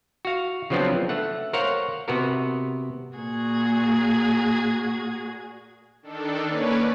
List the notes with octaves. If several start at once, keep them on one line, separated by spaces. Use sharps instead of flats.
F#4 F5
C#3 F3 F#3 B3 C4 D4
A3 F#5
A#4 C5 C#5 F5 F#5
C3 B3 F#4 A#4
A#2 F#4 G#4 G#6
D#3 D4 A4
A#3 C#4 B4 C#5 D5